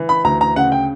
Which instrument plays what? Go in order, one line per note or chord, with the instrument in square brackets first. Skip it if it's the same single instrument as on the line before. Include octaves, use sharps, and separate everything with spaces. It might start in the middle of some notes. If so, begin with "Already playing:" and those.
Already playing: [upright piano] E3
B5
D2 A#5
A#5
C#3 F#5
G5